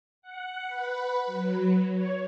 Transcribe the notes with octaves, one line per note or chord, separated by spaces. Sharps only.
F#5
B4
F#3
C#5